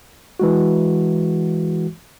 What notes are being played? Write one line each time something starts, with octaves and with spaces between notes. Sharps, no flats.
E3 G#3 F#4